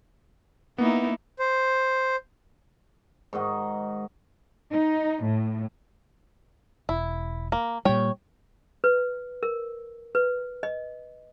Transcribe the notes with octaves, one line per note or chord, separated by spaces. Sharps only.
A#3 B3 D#4 E4
C5
G#2 D#3 F#4 D#5
D#4
A2
E1 E4
A#3
A#2 G3 C#5 G5
B4
A#4
B4
D#5